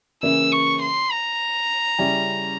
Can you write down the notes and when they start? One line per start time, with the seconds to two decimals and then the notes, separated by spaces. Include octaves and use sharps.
0.23 C#3 E3 A#3 C#4 E4 E6
0.52 C#6
0.82 C6
1.11 A#5
1.99 C#3 G3 C#4 E4